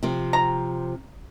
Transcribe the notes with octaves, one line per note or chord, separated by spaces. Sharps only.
C3 F3 C4
A#5